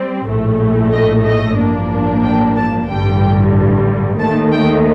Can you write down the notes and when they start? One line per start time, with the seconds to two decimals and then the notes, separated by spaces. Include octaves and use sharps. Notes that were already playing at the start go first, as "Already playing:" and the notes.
Already playing: G3 C4
0.27 A#1 A2 A3
0.92 D#5
1.25 D#5
1.57 A1 G2 F3 A#3 D4
2.23 G5
2.55 A5
2.88 A1 G2 D3 G3 G5
4.19 D#2 D#3 A3 A5
4.51 G5